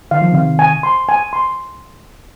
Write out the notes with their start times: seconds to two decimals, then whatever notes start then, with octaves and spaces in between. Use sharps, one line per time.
0.11 D#3 F5
0.22 F3
0.32 C3 D#3 F5
0.59 G#5
0.83 C6
1.09 G#5
1.33 C6